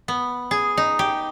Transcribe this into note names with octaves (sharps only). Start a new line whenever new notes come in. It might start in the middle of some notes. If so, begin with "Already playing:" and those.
B3
G#4
D#4
G4